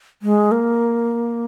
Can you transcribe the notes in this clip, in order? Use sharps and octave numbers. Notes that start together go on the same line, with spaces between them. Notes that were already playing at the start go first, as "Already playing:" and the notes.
G#3
A#3